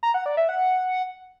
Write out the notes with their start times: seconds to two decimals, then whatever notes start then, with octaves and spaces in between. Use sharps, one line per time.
0.03 A#5
0.14 F#5
0.26 D5
0.37 E5
0.49 F#5